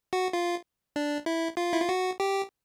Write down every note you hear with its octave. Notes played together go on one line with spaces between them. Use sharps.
F#4
F4
D4
E4
F4
E4
F4
F#4
G4